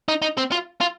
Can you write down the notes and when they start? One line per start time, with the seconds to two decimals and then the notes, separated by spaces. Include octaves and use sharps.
0.08 D#4
0.22 D#4
0.38 C4
0.52 F4
0.81 F4